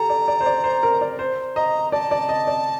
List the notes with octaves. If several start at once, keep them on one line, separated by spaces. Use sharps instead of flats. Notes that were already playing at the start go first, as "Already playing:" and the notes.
Already playing: G4 A4 A#5
D5
D5
C5
D5
C5
A#4
D5
C5
D#5 A#5
D5 A5
D5
D#5
D5